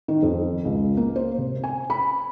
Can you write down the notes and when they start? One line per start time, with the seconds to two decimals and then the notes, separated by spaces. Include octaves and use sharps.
0.08 D#3
0.23 F2
0.65 C#2
0.97 A#3
1.16 C5
1.38 C3
1.64 G#5
1.90 B5